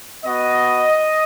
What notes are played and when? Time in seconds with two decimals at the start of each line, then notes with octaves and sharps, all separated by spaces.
0.24 B3 F#4 D#5